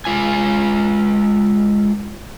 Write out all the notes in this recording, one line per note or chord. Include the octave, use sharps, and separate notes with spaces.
G#3 F4 G#5